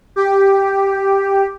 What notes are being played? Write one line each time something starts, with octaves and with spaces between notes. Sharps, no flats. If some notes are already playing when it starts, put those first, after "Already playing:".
G4